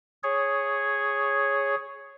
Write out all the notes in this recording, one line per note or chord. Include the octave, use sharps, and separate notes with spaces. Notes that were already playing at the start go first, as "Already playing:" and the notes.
G#4 C#5